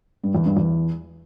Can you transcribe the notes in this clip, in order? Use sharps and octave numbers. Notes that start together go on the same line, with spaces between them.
G2
E2
G2
E2